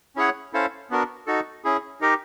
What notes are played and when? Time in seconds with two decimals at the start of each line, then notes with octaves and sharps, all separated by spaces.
0.16 C#4 E4 G#4 C#5 F#5
0.53 C#4 E4 A4 C5 F5
0.90 B3 D4 F#4 A#4
1.27 D#4 F#4 A4
1.64 C#4 E4 G#4
2.01 D#4 G4 A#4 D#5